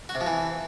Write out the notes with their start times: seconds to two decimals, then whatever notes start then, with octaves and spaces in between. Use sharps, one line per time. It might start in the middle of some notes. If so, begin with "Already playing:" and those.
0.09 F#4
0.15 C3
0.21 F3
0.27 E3